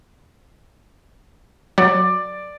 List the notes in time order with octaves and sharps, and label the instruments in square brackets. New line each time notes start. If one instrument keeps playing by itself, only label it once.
[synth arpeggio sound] F#3 [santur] D5